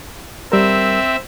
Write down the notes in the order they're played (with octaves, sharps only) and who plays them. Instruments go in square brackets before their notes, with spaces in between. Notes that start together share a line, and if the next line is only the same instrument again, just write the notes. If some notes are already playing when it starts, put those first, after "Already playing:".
[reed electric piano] G3 A#4 [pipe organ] C4 E5